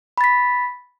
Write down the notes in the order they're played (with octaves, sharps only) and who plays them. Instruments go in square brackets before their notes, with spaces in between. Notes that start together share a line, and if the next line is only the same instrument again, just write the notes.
[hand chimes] B5
A6
B6